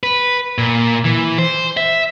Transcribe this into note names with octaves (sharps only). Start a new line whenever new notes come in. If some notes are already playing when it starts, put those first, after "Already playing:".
B4
A#2
E3
C5
E5